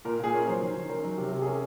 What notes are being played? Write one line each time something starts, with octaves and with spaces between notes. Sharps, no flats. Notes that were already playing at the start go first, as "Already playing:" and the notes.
A#2 A#4
A#2 G#4
C#4 A#4
F#3 C5
D#3
D#3
C#4 A#4
F#3
C3
C3
G#4
C#4 A#4